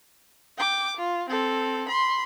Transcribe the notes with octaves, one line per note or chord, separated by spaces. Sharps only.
G5 D6
F4
C4 A4
B5 C6